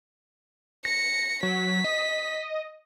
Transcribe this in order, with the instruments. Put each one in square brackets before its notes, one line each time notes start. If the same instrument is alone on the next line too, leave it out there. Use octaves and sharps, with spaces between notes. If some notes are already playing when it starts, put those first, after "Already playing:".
[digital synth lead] A#6 [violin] C#7
[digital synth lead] F#3 [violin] B6
[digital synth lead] D#5